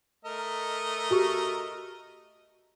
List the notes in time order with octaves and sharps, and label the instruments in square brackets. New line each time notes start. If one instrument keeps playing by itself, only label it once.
[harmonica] A3 A#4 D#5
[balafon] F#4 G4 C#6